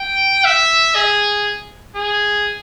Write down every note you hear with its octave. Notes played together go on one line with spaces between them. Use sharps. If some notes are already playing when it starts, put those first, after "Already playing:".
Already playing: G5
E5
G#4
G#4